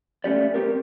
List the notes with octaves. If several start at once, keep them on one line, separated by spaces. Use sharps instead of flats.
A3 C#4 G4 D5
C4 G4 A#4